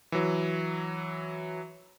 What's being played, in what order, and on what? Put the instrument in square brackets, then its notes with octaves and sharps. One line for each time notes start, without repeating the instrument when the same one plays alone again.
[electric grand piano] E3 F#3